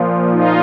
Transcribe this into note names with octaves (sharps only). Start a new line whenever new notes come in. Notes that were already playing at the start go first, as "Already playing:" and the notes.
Already playing: A#2 F3
D#4 F4